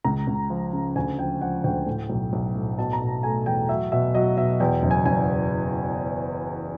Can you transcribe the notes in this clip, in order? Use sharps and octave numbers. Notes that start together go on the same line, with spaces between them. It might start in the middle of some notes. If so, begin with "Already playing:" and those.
C#2 A#5
C#2
F3
C#3
D2 G#5
F3 G5
F3 F#5
D2 G5
A2
B1
B1
A2
B2 A5
A#5
B2
A5
A3 G#5
E2 G5
F#3 E5
B2 E5
F#3 D#5
B2 E5
E2 G5
F#1
G#5
F#1 G#5